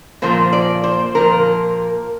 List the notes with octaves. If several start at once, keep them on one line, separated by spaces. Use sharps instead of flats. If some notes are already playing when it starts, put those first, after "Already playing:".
A#2 F3 A#3 C5
D5
C5
A#2 F3 A#3 A#4